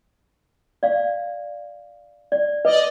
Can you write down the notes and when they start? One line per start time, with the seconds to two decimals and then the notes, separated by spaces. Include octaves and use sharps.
0.83 D5 F5
2.32 D5
2.65 B4 D5 D#5